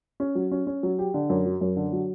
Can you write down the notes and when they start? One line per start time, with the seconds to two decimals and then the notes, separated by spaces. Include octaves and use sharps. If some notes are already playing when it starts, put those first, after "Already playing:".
0.20 C#4
0.35 F#3
0.51 C#4
0.67 C#4
0.83 F#3
0.99 G4
1.14 D3
1.30 F#2
1.46 F#3
1.61 F#2
1.76 D3
1.93 F#3